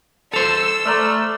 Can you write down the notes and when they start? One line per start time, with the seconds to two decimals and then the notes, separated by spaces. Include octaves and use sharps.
0.33 A4 C5 E6 A6 F7
0.86 A3 D5 A#5 C6 F6